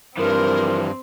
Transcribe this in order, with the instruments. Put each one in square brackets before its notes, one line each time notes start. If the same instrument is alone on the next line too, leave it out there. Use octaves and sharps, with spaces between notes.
[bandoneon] G2 [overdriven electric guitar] E3 F3 [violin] C4 [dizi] A#4